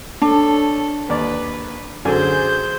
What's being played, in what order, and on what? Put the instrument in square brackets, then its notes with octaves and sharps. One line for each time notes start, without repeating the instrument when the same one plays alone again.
[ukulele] D4 [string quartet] A4 C#5
[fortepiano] D#2 D5 [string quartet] B4
[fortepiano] F#2 D3 G#5 [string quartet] G#4 C5 G6